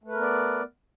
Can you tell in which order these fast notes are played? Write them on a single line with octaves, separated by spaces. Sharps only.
A3 B4 A#4 B3 D5